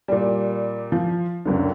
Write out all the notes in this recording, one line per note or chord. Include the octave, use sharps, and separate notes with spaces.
A#2 G3
F3
C#2 F#2 D3